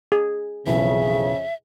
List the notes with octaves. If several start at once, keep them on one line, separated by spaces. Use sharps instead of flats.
G#4
B1 F2 C#3 E3 E5